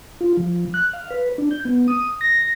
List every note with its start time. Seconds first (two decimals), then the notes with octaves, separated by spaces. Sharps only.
0.20 F4
0.37 F3
0.74 F#6
0.93 F5
1.10 B4
1.38 D4
1.51 G6
1.65 B3
1.88 D#6
2.21 A#6